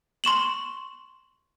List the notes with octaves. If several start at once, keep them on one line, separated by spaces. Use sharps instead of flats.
C6 C#6 E7 F#7